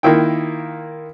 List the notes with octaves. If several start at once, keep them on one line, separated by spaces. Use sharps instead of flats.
D#3 A#3 E4 F4 G5